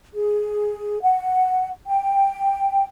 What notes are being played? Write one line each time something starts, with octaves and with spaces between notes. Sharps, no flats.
G#4
F#5
G5